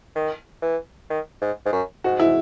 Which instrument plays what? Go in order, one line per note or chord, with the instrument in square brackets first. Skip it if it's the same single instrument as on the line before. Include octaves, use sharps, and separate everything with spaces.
[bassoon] D#3
E3
D#3
G#2
G#2
F#2
[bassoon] G#2 [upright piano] F#4
[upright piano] E4